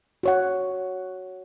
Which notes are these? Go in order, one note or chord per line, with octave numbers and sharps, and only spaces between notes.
F#4 C#5 F#5